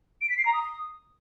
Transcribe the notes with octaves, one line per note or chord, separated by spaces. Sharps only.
D7
B6
C7
A#5
D#6